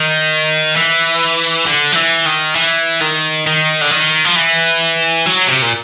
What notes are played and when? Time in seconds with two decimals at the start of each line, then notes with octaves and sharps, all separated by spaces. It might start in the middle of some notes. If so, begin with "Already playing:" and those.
Already playing: D#3
0.76 E3
1.67 D3
1.92 F3
1.96 E3
2.26 D#3
2.56 E3
3.01 D#3
3.47 D#3
3.81 D3
3.91 D#3
4.25 F3
4.36 E3
5.26 F#3
5.47 C3
5.62 A#2